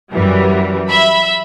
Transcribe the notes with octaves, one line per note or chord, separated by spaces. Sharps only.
F#2 E3 G3
E5 B5